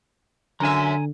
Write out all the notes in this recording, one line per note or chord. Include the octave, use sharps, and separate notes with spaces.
F#2 D3 E5 G#5 A#5